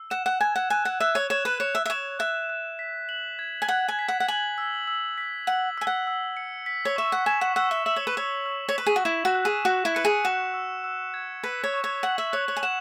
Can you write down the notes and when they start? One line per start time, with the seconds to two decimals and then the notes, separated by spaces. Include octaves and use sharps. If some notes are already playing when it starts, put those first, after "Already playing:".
Already playing: E6
0.10 F#5 E7
0.26 F#5
0.41 G#5 G#6
0.56 F#5
0.70 G#5 F#6
0.85 F#5
1.00 E5 F#6
1.15 C#5
1.30 C#5 E7
1.45 B4
1.60 C#5 E7
1.75 E5
1.85 E5
1.90 C#5 E7
2.19 E5 F#6
2.49 F#6
2.79 B6
3.09 F#7
3.39 G#6
3.62 G#5
3.68 F#5 G#6
3.88 G#5
3.99 B6
4.08 F#5
4.20 F#5
4.28 G#5 F#7
4.58 E6
4.88 E6
5.18 B6
5.47 F#5 F#7
5.78 G#5 E6
5.87 F#5
6.07 E6
6.37 C#7
6.66 B6
6.85 C#5
6.96 E5 C#6
7.12 F#5
7.26 G#5 E7
7.41 F#5
7.56 F#5 E6
7.71 E5
7.86 E5 F#7
7.96 C#5
8.07 B4
8.16 C#5 E6
8.46 E6
8.69 C#5
8.75 B4 B6
8.86 G#4
8.96 F#4
9.05 E4 E7
9.25 F#4
9.35 F#6
9.45 G#4
9.65 F#4 F#6
9.85 E4
9.95 B4 C#7
10.05 G#4
10.25 F#4 E7
10.54 E6
10.84 E6
11.14 G#6
11.43 B4 B6
11.63 C#5
11.74 C#6
11.84 C#5
12.03 F#5 F#7
12.18 E5
12.33 C#5 F#6
12.48 C#5
12.57 G#5
12.63 F#5 E7